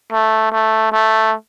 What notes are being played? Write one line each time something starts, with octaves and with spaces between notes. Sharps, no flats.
A3
A3
A3